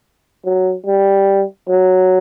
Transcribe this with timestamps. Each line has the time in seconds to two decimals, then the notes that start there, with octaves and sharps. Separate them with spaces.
0.45 F#3
0.86 G3
1.68 F#3